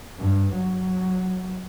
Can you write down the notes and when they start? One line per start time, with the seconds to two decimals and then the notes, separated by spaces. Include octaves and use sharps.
0.19 G2
0.53 F#3